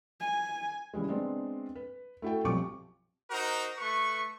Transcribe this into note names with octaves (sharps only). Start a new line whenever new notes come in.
G#5
C#3 E3 G3 G#3
G#3 B3 C4 D4
B4
A3 E4 F#4 A4 G5
B1 F3 G3 C4 C#6 D6
D#4 F#4 A#4 C5
A3 B4 C#6